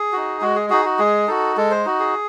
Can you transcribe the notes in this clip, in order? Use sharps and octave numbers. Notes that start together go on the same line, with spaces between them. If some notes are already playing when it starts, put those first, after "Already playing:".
Already playing: G#4
D#4 F#4
G#3 F#4
G#4
D#4 F#4 G#4
F#4
G#3 G#4
D#4 F#4 A4
G#3 A4
C5
D#4 F#4
G#4